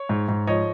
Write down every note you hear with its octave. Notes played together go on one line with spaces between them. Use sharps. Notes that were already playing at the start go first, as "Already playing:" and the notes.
Already playing: C#5
G#2
G#2
F3 C#5 D#5